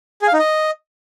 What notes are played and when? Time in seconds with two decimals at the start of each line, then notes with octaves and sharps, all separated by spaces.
0.22 G#4
0.27 F5
0.33 D#4
0.39 D#5